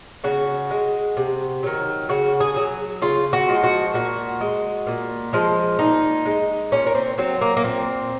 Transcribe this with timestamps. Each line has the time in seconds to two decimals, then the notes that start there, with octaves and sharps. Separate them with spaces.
0.24 C#3 F#4
0.71 G#3
1.17 C3
1.63 D#3 F#3
2.09 C#3 F#4
2.40 G#4
2.56 F#3
3.02 C#3 F4
3.33 F#4
3.48 F3 G#3
3.64 F#4
3.94 A#2 F#4
4.41 G#3
4.87 A#2
5.33 F3 G#3
5.79 A#2 D#4
6.25 G#3
6.72 A#2 C#4
6.87 A#3
6.95 C4
7.18 F#3 C4
7.41 A#3
7.57 A#3
7.64 A#2 C4